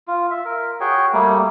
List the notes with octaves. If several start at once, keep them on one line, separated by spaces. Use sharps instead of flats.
F4
E5
A#4
F#4 G#4 C#5 G5
G3 A3 A#3